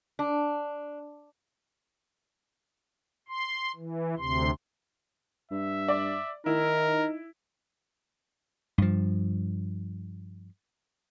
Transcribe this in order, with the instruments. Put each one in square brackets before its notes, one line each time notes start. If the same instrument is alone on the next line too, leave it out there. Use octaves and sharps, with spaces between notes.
[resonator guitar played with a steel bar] D4
[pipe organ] C6
E3
D2 C3 C6
[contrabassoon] G2 [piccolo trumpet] E5
[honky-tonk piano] D5
[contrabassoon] D#3 [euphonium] D#4 [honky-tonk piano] E4 [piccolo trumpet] A#4
[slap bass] G2 F3